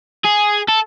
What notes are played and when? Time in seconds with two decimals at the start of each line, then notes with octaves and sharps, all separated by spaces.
0.24 G#4
0.68 A4